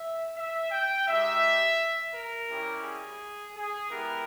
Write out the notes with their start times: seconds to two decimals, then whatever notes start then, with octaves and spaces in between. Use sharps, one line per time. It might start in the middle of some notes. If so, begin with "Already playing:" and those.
Already playing: E5
0.36 E5
0.71 G5
1.06 G#3 D#4 G4 E5
2.13 A#4
2.49 G3 C#4 E4 G4
2.83 G#4
3.55 G#4
3.90 G#3 B3 E4 G4 A#4